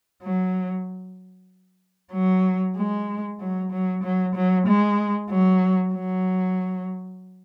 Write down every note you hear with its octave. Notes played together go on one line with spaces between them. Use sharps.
F#3
F#3
G#3
F#3
F#3
F#3
F#3
G#3
F#3
F#3